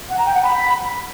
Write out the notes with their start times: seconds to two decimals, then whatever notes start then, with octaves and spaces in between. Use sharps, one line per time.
0.09 F#5
0.17 A#5
0.25 G5
0.34 F#5
0.42 B5